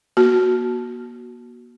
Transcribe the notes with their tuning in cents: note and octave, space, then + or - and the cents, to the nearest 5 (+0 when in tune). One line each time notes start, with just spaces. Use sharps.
A#3 +45 F#4 +0